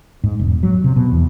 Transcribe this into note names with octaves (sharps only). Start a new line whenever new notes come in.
G#2
E1
F#3
C3
B2
E2